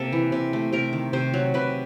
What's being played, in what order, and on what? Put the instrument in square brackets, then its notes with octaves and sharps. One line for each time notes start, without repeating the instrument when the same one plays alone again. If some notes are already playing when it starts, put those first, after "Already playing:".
Already playing: [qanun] C3 A#3 A4
E3
C3
A3
C3 A#4
D#3
C3 C5
F#3
C3 B4